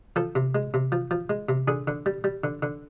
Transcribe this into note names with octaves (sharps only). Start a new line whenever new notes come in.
F3 A4
C3
G#3
C3
F3
F3
G#3
C3
D3 G#4
D3
G3
G3
D3
D3